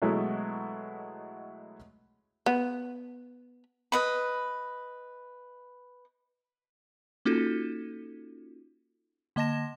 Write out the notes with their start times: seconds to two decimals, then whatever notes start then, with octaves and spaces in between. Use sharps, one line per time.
0.02 B2 E3 F#3 G#3 A3 E4
2.46 B3
3.92 B4 D#5 B5
7.25 A#3 C#4 D#4 F4 F#4 A4
9.36 D3 A#3 D#5 A5 A#6 E7